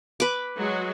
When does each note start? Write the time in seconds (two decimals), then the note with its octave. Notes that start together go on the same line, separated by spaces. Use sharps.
0.20 B4 D6
0.55 F#3 G#3 F#4